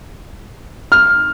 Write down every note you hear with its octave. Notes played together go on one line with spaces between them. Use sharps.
F6